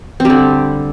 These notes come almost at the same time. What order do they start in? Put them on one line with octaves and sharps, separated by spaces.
C4 G3 D3